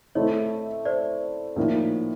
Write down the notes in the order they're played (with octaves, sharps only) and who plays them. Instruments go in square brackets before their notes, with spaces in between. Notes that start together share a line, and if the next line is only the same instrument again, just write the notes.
[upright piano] A3 C4 E4 [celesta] C#5 D#5
[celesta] C5 D5
[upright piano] A2 F3 A#3 D#4